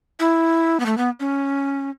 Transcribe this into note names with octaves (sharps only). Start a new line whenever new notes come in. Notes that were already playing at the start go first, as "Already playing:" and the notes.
E4
B3
A3
B3
C#4